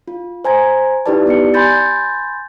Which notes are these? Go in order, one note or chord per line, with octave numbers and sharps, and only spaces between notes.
F4
C5 G#5 A#5 G#6
D#4 E4 G4 B4 D5 A5
B3 G4 D5 C#7
G#5 B5 C6 G6 A6